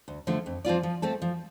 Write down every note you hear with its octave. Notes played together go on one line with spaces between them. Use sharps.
D2
D3 F3 A3
F2
F3 C4 F4 D5
F3
A3 C4 A4
F3